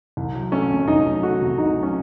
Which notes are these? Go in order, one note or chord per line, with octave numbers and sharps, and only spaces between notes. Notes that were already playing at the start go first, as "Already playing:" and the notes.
C2
F#3
A3 C#4
C3
C2 D#4
F#3
A3 F#4
C3
C2 D#4
F#3
C#4